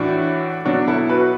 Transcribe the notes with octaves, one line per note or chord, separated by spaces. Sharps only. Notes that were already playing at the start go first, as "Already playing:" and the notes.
Already playing: A2 E3 D4 F#4
B2 F#3 D4 F#4
E4 A4
F#4 B4